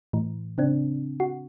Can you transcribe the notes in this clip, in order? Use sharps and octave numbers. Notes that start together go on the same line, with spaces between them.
A2 E3
C#3 C4 D4
F#4